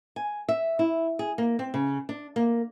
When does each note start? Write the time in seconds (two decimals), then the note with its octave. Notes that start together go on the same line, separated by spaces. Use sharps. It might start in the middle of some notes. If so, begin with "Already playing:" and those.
0.16 G#5
0.48 E5
0.79 E4
1.19 G#4
1.38 A#3
1.59 C4
1.74 C#3
2.09 D4
2.36 A#3